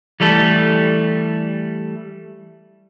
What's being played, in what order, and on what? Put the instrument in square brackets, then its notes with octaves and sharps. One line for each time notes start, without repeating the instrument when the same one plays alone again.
[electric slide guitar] E3 G3 A3 A4